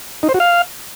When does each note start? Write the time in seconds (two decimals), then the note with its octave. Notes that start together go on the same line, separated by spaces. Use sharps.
0.23 D#4
0.29 C5
0.34 F#4
0.40 F5